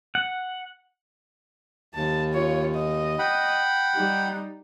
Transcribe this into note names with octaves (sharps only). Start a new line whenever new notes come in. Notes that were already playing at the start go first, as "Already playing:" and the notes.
F#5
D#2 A5
F4 C#5
D#5
F#5 G5 B5
G3 D#4